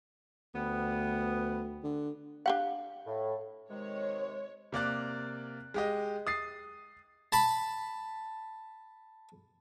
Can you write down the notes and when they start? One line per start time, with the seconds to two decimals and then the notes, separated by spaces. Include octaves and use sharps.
0.55 D2 G3 B3
1.84 D3
2.46 D4 G4 F5 F#5
3.07 A2
3.70 C3 D#3 G#3 C#5
4.72 C3 A#3 D5 F#6
5.74 G#3 G4 D#5
6.27 D#6 A6 C7
7.32 A5 B5